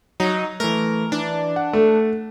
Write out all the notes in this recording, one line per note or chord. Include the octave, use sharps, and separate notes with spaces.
F#3 D#4
E3 A3 A#4
E3 D4
F#5
A3